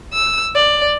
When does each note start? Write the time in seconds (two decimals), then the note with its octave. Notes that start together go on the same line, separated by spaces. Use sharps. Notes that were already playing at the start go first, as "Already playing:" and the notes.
0.13 E6
0.55 D5